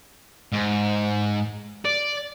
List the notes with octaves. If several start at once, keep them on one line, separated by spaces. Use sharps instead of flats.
G#2
D5